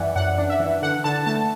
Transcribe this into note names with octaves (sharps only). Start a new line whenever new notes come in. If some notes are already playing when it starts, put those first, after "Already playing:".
Already playing: F#2 E3 D5 E5 F#5
F#2 F#5
D4
E5
E3
D3 F#5
D3 A5
A3 A5